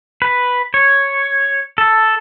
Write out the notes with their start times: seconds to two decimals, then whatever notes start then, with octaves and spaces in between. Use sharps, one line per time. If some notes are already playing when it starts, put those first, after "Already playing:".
0.22 B4
0.74 C#5
1.78 A4